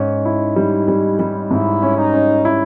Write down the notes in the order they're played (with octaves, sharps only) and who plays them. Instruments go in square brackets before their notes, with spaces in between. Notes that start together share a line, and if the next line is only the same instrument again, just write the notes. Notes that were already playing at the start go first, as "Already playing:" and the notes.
Already playing: [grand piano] G#2 C#4 [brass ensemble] D#4
[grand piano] E4
G3
G3
G3
[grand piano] G#2 [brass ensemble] E4
[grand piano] C#4
[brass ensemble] D#4
[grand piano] C#4
E4